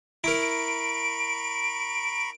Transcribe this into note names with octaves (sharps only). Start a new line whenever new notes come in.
E4 A#4 A#5 B5 C#6 D7